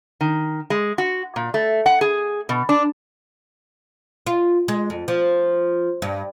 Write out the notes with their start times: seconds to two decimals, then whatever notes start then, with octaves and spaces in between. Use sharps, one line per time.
0.21 D#3
0.70 G#3
0.98 F#4
1.36 A#2
1.54 A3
1.86 F#5
2.01 G#4
2.49 B2
2.69 D4
4.27 F4
4.68 G#3
4.90 F2
5.08 F3
6.02 G2